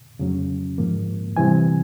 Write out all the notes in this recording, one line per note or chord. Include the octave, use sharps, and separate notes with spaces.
F2 C#3 F#3 A3 C#4
G#2 F3 A#3
C3 E3 G3 C4 G#5